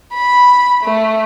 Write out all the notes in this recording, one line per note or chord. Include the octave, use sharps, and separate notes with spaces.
B5
A3